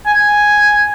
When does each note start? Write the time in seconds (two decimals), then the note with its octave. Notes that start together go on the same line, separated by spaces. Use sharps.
0.06 G#5